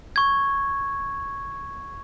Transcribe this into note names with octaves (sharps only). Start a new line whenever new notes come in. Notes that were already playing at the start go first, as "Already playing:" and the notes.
C#6 G#6